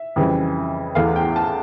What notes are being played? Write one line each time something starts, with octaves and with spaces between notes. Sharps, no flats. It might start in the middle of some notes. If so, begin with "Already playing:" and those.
Already playing: E5
F2 C#3 E3 G3
E2 E3 A3 F5
G5
A5